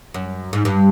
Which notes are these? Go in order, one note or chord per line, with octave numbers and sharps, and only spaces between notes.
F#2
G#2
G2